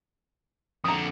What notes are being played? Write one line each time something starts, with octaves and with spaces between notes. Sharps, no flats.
F2 D3 A#5 D#6